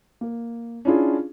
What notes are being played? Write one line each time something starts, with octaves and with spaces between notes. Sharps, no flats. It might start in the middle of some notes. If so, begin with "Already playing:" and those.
A#3
C#4 D4 E4 F4 G#4